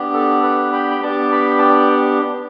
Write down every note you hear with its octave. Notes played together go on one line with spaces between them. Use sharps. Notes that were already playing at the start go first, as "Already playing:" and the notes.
Already playing: B3 D4 G4
A4
B4
G5 B5
B5
B3 D4 G4 A5 D6
G5 B5
A5
D5 G5